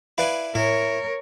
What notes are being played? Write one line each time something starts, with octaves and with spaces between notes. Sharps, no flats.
E4 B4 D5 F5 G#5 B5
A2 E4 A#4 C#5